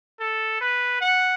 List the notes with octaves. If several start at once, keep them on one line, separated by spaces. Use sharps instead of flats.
A4
B4
F#5